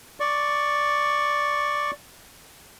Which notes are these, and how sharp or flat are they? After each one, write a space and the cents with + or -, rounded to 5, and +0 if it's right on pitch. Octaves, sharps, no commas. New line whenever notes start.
D5 +0 C#6 +0